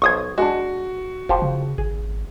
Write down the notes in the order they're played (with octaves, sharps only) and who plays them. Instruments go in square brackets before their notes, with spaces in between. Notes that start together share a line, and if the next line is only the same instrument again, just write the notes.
[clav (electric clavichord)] B1 C5 [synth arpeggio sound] C#6 D#6 G#6
[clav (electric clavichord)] G#3 D4 [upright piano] F#4
[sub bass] F1 [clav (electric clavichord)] F3 G4 C5
[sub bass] C#3
[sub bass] G#1 [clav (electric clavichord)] G#4